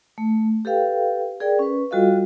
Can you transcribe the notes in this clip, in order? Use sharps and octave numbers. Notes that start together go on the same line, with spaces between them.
A3
G4 A4 B4 F5 G5
G#4 A#4 D5 G5
C#4 B4
G3 F4 F#4 A4 D#5 F5